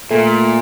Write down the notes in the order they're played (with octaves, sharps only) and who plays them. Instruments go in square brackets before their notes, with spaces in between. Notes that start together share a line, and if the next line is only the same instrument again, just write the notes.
[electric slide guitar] A#2 [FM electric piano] A3